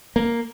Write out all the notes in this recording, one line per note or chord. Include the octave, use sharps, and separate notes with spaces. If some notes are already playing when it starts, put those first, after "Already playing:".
A#3